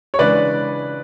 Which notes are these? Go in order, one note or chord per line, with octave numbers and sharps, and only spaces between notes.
C#5
C#3 E3 G#3 D4 B4 D5